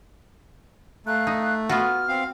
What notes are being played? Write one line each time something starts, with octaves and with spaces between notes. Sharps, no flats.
A3 F5 A#5 F#6
D#4
B3 F4 F#4 F6
C4 F5